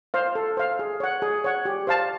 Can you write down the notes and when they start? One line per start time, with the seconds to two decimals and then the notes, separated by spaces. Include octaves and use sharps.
0.14 C5 F5
0.35 A4
0.57 C5 F5
0.79 G#4
1.00 C#5 F#5
1.22 G#4
1.44 C#5 F#5
1.65 G4
1.87 C5 F5 A5